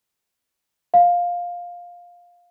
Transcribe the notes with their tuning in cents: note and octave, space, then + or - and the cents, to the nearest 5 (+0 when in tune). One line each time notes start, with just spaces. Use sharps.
F5 +10